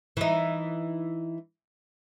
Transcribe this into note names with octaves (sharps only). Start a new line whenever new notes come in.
E3 D#4